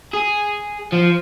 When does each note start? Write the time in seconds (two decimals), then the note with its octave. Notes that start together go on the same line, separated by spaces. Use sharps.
0.13 G#4
0.93 F3